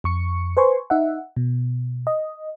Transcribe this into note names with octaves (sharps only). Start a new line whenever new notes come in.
F2 C#6 C#7
B4 C5 G#5 C6 C#6
D#4 E5 F#5
B2
D#5